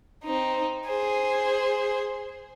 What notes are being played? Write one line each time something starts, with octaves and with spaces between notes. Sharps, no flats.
C4 D#4
G#4 C5